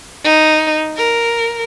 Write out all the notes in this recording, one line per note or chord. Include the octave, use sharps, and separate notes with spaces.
D#4
A#4